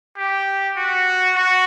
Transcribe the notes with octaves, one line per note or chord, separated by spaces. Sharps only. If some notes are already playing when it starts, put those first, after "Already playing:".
G4
F#4
F#4